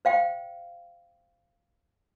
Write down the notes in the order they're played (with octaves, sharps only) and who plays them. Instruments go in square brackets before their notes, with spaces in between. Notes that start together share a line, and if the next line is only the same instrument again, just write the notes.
[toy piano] C5 F5 G5